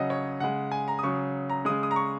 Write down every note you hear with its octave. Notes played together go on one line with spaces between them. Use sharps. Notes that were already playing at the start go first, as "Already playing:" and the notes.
Already playing: C#3 F#3 D#5 F#5
C#5
C#3 G#3 F#5
G#5
A#5
D#6
C#3 F#3 C#6
A#5
C#3 G#3 D#6
D#6
A#5
C#6